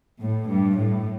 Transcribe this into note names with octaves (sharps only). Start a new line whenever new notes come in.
A2
G2
A2